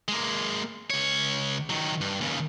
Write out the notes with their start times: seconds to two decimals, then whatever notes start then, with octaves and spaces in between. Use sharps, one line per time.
0.08 G#3 A#3
0.90 C#2 C#5
1.70 D#3 F#3
2.01 G2
2.21 D#2 C#3